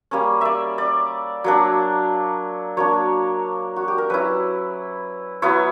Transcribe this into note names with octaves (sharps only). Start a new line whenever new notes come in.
G3 A#3 C#4
D5 E5
D5
F#3 A#3 D4
F#3 A#3 D4 C#5
F#4
G4
A#4
F#3 C#4 E4 B4
F#3 B3 E4 C#5